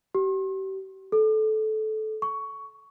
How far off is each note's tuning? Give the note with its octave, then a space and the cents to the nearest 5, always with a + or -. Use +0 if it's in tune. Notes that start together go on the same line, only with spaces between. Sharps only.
G4 -35
A4 -20
C#6 +15